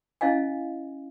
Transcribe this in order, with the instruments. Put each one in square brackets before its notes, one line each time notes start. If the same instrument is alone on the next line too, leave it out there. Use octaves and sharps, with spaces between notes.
[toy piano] C#4 E4 D#5 F5 G#5